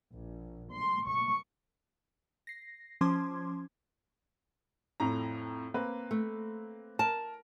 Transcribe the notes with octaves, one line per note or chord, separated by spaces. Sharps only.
A#1
C6
C#6
A#6 C7
F3 C#4 C5 C6 D6 G#6
F2 A2 A#5
A#3 C4 B4
A3
A#4 A5